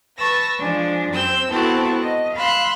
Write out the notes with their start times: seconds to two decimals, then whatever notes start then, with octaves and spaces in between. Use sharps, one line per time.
0.17 B4 A5 C#6 E6 A#6
0.58 F3 G#3 D4
1.09 F#2 C4 E6 G6
1.50 B3 C4 E4 F#4 A4 A5
2.02 D#5
2.34 F5 B5 C6 E6 F#6